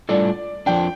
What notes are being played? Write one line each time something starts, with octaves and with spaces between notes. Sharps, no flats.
A2 G3 D4 F4 A4 D5
F2 F3 D4 G5